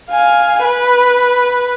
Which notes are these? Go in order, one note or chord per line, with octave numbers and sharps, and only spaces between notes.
F5 G#5
B4